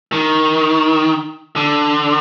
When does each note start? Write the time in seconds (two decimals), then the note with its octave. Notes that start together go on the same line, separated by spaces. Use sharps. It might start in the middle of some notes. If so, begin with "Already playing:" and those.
0.13 D#3
1.56 D3